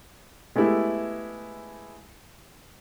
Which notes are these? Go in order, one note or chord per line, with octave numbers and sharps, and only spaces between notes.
G#3 A3 B3 E4 G4 A4